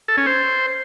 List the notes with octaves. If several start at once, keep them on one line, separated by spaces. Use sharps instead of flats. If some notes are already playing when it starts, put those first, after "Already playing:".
A4
C#4
C5